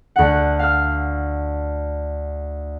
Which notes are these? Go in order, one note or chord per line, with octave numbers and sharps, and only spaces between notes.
D2 F#5
F5 E6 F6